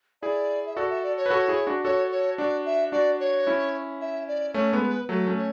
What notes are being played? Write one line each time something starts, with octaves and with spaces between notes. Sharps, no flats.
E4 G#4 D5
E5
F#4 A4 D5
E5
D5
C#5
B4
F#4 A4
E4 G#4
D4 F#4
F#4 A4 C#5
C#5
D4 F#4 D5
E5
D4 F#4 D5
C#5
C#4 E4
E5
D5
A3 C#4 C#5
G#3 B3 A4
B4
F#3 A3 A4
A3 C#4
C#5